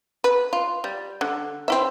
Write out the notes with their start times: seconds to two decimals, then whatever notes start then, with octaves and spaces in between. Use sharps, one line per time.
0.24 B4
0.53 F4
0.84 G3
1.21 D3
1.68 C4 E4 E5